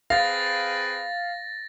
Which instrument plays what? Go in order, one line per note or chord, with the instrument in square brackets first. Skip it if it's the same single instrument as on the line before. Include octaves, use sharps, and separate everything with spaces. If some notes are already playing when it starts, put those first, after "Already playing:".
[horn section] C4 G#4 B4 [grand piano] F5 [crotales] A6 A#6